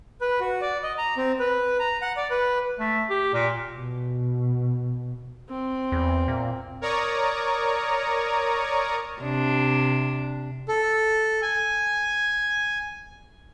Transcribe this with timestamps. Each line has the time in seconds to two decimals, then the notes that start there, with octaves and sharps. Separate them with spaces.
0.21 B4
0.40 F#4
0.61 D5
0.83 D#5
0.98 A#5
1.17 C4
1.39 B4
1.79 A#5
2.02 F#5
2.17 D5
2.30 B4
2.79 A3
3.10 G4
3.34 A#2
3.73 B2
5.49 C4
5.92 E2
6.28 A#2
6.81 A#4 C#5 D5 A#5 C#6 D#6
9.22 C3 D4
10.68 A4
11.42 G#5